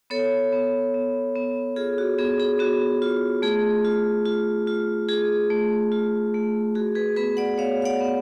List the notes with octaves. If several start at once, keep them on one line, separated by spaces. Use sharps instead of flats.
B3 A4 C#5
B3
B3
B3
F4 G#4
F#4
B3 G#4
G#4
B3 F#4
F4
A3 G#4
F4
F4
F4
F4 G#4
A3
F4
A3
F#4 G#4
G#4 B4
B3 G#4 B4
D5 F#5
B3 C#5 F5
F5
D5 F#5
B3